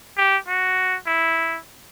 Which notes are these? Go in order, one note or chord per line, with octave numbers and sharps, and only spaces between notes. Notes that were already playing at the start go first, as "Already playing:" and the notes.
G4
F#4
E4